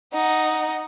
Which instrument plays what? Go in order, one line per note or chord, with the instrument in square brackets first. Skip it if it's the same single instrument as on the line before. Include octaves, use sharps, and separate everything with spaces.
[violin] D#4 F#5